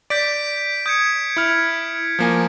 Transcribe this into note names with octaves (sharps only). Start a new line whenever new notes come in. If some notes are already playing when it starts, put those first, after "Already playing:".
D5 G6 B6 D7
D#6 G6 G#6 C#7
E4 F6
F3 A#3 G#5